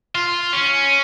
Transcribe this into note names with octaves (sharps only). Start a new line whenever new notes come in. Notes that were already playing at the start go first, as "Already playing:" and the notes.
F4
C#4